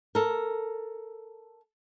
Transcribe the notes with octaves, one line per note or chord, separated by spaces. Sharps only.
A4 A#4